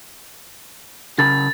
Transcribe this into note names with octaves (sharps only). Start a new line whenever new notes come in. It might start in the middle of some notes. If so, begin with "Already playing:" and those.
C#3 A#4 B5 A6